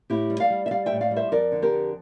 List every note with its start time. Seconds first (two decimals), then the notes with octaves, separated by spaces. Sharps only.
0.10 A2 E4 G4
0.30 G3
0.40 D5 F5
0.50 G3
0.66 E5
0.71 G3 D5 F5
0.86 E5 G5
0.92 A2
1.01 D5 F5
1.11 G3
1.16 C5 E5
1.32 F2 A#4 D5
1.52 D3
1.62 G4 A#4
1.72 F2